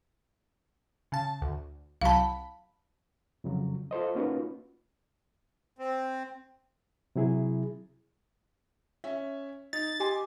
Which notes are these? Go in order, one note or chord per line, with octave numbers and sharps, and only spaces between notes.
C#3 A5
D2
C2 F#3 F5 A5 B5
F2 C#3 F#3
F4 A4 C5 D#5
A#3 C#4 D#4 F4 F#4 B4
C4
C3 F#3 E4 G#4
C#4 E5
D#4 A6
G4 D#5 G#5 C6